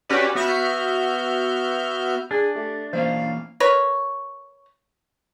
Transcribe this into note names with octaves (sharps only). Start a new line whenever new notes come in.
C#4 F#4 G4 B4 D5
B3 F#4 E5 F6 G6
D4 G#4
A3 G4
E3 A#3 C#4 C5 D#5 F5
A#4 B4 C#5